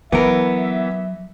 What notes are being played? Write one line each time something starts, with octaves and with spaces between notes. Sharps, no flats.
E3 F#3 B3 A#4 E5